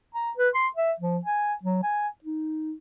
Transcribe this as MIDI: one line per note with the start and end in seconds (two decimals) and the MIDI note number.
0.15 0.31 82
0.38 0.49 71
0.55 0.68 84
0.77 0.93 76
1.00 1.18 53
1.26 1.54 80
1.64 1.79 54
1.83 2.08 80
2.24 2.74 63